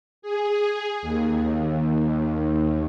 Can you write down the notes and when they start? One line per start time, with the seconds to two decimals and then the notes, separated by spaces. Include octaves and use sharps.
0.22 G#4
1.02 D#2